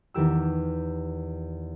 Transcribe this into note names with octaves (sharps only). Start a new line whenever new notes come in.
E2 D#3 G4 E6